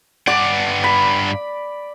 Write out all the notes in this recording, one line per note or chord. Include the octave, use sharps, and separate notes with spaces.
G2 D5 F#5 D6
B5